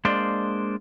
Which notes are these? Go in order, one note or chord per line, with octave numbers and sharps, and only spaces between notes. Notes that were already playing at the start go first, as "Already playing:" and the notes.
G#3 A#3 D4 C5 D5